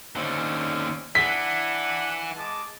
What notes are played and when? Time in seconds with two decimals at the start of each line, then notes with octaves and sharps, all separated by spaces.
0.16 D#2 D3 C4 C#4
1.15 E3 D4 F#5 B6
2.36 G#3 A5 D6